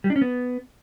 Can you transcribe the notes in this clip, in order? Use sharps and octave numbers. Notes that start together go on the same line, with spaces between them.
G3
D4
C#4
B3